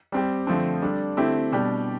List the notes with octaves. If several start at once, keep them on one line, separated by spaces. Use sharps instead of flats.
G3 C4 G4
D3 F3 A3 C4
G3 D4 A4
D3 A3 C4 E4 G4
B2 G3 D4 G4